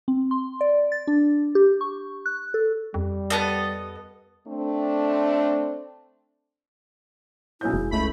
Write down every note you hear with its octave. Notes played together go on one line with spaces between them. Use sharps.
C4
C6
D5
A6
D4
G4
C#6
F#6
A4
F2 G3
B3 A4 D#5
A3 C4 D4
B1 C#4 E4 G6
F1 G#3
C#2 A3 B5